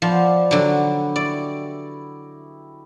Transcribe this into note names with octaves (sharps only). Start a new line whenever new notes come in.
F3 B3 D5 D#5
D3 F#3 D#4 F#4 G4
E4 D5 D#5 C#6